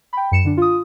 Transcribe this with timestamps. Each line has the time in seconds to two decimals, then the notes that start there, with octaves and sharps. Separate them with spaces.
0.13 G5 B5
0.32 F#2 C#7 E7
0.45 D3 D4
0.57 F4 D#6